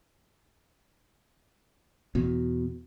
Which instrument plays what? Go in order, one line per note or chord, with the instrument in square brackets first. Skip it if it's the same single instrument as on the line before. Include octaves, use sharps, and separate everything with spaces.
[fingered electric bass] E2 B2